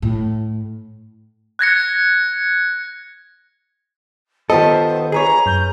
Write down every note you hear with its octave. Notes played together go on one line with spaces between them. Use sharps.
A2
F#6 G#6 A#6 C#7
D#3 B3 F4 G4 A4 C5 D#5
G#4 B4 C#5 A#5
F#2 G6